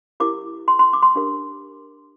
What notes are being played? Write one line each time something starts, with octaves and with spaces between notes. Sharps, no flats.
E4 G4 A#4 D6
C6
C6
D6
C6
D4 G4 A#4